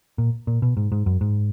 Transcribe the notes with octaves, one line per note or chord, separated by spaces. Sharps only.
A#2
A#2
B2
G#2
G#2
F#2
G#2